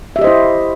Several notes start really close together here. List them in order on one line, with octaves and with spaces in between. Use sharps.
E5 G4 D#5 C5 E4